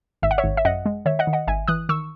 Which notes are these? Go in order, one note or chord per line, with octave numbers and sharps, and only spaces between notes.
G#1 E5
F#5
C#5 E5
G#1
E5
F#2 D#5 F#5
G#3
D#3 C#5 E5
D#5 F#5
D#3
D#5 F#5
G#1 E5 G#5
E3 D#6 F#6
D#3 C#6 E6